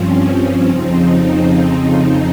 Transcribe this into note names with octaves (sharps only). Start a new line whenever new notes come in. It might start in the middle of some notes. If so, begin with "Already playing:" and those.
Already playing: G2 F3 C4 C#4
F2 C#3 F3 C4 D#4